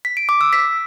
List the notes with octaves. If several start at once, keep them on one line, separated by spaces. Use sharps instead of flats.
B6
D7
D6
E6
B6